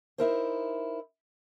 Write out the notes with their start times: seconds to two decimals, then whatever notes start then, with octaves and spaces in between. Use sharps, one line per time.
0.18 D#4 E4 A#4 C5